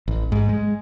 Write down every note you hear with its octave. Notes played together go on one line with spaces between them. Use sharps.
A1
G#2
G#3